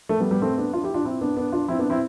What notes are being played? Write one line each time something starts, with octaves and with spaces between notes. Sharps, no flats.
A3
G3 B3
G3 B3
A3 C4
B3 D4
D4 F4
E4 G4
D4 F4
C4 E4
B3 D4
B3 D4
D4 F4
C4 E4
B3 D4
C4 E4